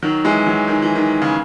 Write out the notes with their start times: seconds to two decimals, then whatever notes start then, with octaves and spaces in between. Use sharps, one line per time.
0.03 D#3 F#3
0.24 E3 G#3
0.46 D#3 F#3
0.68 D#3
0.82 E3
0.95 D#3
1.22 C#3